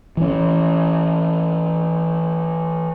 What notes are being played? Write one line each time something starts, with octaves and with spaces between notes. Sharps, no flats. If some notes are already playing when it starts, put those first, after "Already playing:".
E3 C#4